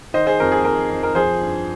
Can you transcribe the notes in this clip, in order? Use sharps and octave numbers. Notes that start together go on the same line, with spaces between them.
D#3 C5 D#5
G#4 C5
F2 A#4
G#4
F2 A#4
F2
A#4
F3 G#4 C5
G2